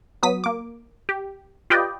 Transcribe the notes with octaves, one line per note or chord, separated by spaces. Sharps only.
F#3 B3 D#6 B6
A#3 D6
G4
F4 G4 B4 D5 D#5 G5